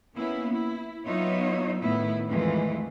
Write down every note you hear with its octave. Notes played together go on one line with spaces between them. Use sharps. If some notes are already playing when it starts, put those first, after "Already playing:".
A#3 B3 C#4 E4
E4
F#3 B3 D#4 F4 C#5 E5
A2 D#3 A3 B3 E4
F2 D#3 E3 G#3 A3 F4